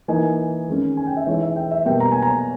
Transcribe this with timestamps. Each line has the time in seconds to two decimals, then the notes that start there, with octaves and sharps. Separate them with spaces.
0.08 E3 A#3 D#4 G#5
0.68 D#3 G#3 C#4
0.97 G#5
1.07 G5
1.17 E5
1.27 E3 G#3 D#4 C#5
1.41 E5
1.56 G5
1.71 E5
1.85 B2 G3 A#3 G5
2.00 A#5
2.12 G#5
2.22 A#5